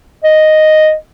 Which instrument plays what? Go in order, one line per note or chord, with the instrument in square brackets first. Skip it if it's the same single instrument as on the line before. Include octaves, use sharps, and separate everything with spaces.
[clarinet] D#5